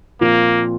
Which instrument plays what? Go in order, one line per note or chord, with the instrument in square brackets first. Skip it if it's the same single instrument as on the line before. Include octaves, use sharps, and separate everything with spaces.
[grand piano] A#2 F3 C4 F4 [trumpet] A#3